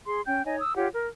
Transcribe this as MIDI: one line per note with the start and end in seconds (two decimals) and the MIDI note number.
0.06 0.20 68
0.06 0.20 84
0.26 0.42 61
0.26 0.42 79
0.26 0.42 91
0.45 0.58 63
0.45 0.58 73
0.45 0.58 75
0.45 0.58 80
0.59 0.76 87
0.59 0.76 88
0.76 0.87 65
0.76 0.87 67
0.76 0.87 73
0.76 0.87 78
0.91 1.06 70